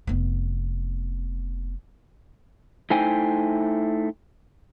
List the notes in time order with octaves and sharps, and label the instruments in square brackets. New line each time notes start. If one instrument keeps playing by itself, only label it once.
[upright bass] F1 B3
[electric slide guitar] A3 D#4 E4 C5 G5 G#5